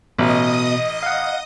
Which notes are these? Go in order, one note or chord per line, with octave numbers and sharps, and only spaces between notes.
A1 B2 D#5 D#6
F5 F#5